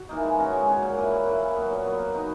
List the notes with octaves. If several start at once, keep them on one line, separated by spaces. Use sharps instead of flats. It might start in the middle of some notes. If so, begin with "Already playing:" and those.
Already playing: F#4
E3 A#3 D#4
G#3
C#4 F#4 C#5
G#3
C#4 F#4 C#5
A#2
A#3 E4 B4
A#2
A#3 E4 B4
A#2
F#3 B3
A#2
F#3 B3
A#3
D#4 F#4 B4